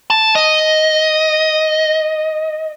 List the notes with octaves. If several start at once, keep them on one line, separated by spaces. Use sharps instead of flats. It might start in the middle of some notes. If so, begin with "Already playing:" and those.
A5
D#5